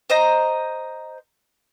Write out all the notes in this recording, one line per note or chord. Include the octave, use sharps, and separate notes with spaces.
C5 D#5 A#5